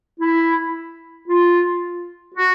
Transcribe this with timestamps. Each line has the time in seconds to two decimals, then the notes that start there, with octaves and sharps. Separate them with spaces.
0.20 E4
1.28 F4
2.34 F#4